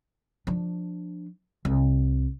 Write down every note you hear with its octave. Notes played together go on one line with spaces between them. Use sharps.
F3 D4
C2